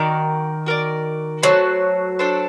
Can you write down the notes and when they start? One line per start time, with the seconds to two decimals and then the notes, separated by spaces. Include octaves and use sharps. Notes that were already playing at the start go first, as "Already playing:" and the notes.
Already playing: D#3 F#4 A#4 D5
0.66 F#4 A#4 D5
1.43 F#3 A3 D4 A4 C5
2.19 A3 D4 A4 C5